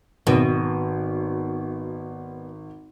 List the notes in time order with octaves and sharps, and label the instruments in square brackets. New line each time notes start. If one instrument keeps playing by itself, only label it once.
[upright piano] G#1 [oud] B2